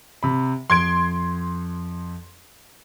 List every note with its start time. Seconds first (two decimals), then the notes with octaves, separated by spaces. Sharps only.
0.23 C3 B5
0.70 F2 C6 G#6 D7